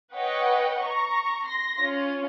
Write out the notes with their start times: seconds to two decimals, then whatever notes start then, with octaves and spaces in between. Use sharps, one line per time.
0.13 B4 C#5 D#5 F#5 G5
0.81 A#5 C#6
1.45 C6 A#6
1.79 C#4 F4